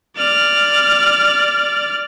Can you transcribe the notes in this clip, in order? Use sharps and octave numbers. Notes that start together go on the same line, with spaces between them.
D5 F6